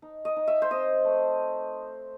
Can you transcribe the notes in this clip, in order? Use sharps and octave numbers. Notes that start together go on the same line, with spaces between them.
D#4
D#5
D#4
E5
C5
C4 D#5
A3